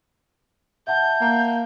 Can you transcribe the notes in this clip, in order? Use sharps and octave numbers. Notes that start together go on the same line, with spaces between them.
E5 F#5 A5 G6
A#3